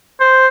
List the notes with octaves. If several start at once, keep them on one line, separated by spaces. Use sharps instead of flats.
C5